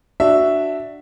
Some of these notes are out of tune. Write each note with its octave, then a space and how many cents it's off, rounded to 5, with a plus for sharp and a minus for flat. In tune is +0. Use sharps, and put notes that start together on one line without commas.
D4 +5 F#4 +0 E5 +0